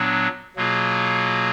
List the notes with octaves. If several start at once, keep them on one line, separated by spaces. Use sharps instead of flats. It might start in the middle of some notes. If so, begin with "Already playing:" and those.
Already playing: A#2 F#3 B3 D4
B2 F#3 A#3 F4 G#4